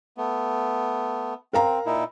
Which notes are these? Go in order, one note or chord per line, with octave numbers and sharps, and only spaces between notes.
A3 B3
C4 A#4 F5 A#5
A#2 D#4 E4